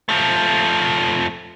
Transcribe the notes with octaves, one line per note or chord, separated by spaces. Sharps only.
F3 A3